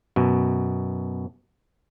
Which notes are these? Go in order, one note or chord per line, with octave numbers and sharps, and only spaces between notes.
F#2 B2